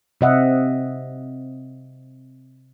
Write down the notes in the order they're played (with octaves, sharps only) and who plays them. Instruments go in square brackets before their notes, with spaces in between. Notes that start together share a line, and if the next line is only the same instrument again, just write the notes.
[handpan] C3 C4 D#5 E5 F#5